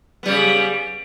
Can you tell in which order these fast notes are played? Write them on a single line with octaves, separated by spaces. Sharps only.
B3 G3 C#3